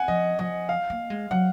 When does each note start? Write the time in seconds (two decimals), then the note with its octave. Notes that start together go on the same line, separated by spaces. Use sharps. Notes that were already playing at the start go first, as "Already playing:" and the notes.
Already playing: F#5 G#5
0.08 F3 D#5
0.39 F3 D#5
0.69 F5
0.90 A#3
1.10 G#3
1.31 F#3 F#5